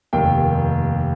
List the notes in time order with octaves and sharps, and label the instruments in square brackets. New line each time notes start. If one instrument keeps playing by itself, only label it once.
[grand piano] F1 D#2 D#3 G5